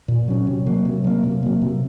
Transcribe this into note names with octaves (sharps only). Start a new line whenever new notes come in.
A#2
F#3 C#4
C3
F#3 A#3
C3
F#3 A#3
C3
F#3 A#3
C3